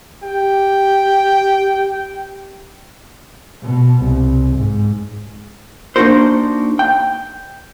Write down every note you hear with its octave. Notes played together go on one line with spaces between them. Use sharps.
G4 G5
B2
C2
G#2
A#3 D4 D#4 F#4 A#4 C5
G5